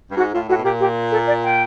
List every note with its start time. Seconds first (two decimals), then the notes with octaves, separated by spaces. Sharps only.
0.10 G2
0.17 G#2 F#4
0.32 A2 F4
0.49 A2 F#4
0.57 B2
0.64 A#2 G4
0.80 G4
1.11 A4
1.27 D5
1.44 G5